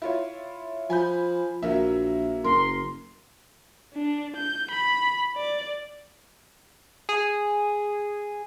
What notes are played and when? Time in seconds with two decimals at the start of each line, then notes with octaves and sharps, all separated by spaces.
0.02 E4 F4 C#5
0.90 F3 G#5 B5 G6
1.63 A#1 F#3 A#3 E5
2.44 F#1 A#4 C6
3.94 D4
4.36 G6
4.71 B5
5.37 D5
7.09 G#4